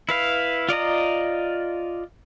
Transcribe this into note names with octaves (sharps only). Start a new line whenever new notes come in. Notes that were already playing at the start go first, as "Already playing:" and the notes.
E4 B4 F5
F4 D5 D#5 A#5